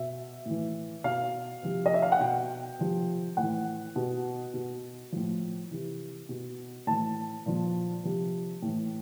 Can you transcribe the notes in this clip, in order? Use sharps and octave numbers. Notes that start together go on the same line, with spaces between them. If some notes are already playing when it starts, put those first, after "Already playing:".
Already playing: B2 E5
A2 E3
B2 F5
C3 F3
D#5
E5
F5
F#5
B2 G5
C3 F3
A2 E3 F#5
B2
B2
A2 F3
C3 E3
B2
A2 E3 A5
A#2 F3
C3 F3
A2 E3